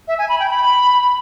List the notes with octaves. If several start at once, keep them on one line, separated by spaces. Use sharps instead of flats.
E5
G#5
B5
G5
B5